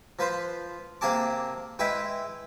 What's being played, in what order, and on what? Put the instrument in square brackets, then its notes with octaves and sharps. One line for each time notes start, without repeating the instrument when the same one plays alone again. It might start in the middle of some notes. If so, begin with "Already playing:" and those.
[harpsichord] F3 B4 C5
C3 A#3 G#4 A5 D6
G#3 E4 B4 E5 G5